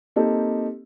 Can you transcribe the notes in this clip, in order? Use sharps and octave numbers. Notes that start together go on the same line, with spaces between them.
A#3 C4 D#4 G4 A4